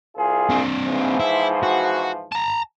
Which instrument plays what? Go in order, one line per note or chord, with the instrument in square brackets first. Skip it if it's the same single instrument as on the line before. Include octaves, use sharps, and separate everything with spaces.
[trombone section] C2 F4 G#4
[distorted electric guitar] C4 D4
[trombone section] G#2 E3 F3
[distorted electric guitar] E4
F#4
A5 A#5